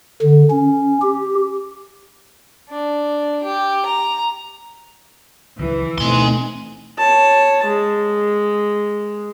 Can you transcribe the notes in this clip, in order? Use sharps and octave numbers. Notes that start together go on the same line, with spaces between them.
D3
C#4
G4
D4
G4
A#5
C#2 D#3 E3 F#3
D2 B2 A3 C4 D#4 G#5 C6
C#5 A5
G#3